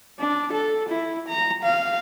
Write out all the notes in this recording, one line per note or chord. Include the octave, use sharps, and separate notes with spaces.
D4
A4
E4
A#5
F5